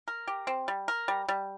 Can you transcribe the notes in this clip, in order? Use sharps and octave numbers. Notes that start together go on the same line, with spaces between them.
A#4
G4
C4
G3
A#4
G3
G3